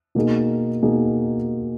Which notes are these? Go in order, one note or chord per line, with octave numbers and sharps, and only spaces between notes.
B2 A#3 D#4 G#4
B2 A#3 D#4 G#4